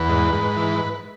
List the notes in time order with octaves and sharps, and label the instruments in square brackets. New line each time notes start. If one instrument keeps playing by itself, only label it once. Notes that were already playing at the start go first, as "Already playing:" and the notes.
Already playing: [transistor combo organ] E2 B4
G#2
G#2
E3